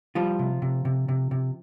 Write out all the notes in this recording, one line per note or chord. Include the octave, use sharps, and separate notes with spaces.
F3 G3 F4
C3
C3
C3
C3
C3